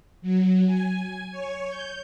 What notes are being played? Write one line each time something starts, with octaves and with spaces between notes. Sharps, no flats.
F#3
G#5
C#5
G6